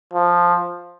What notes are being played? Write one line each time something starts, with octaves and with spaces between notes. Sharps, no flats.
F3